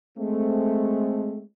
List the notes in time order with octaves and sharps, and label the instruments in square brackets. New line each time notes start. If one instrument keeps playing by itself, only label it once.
[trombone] G#3 [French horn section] A3 C4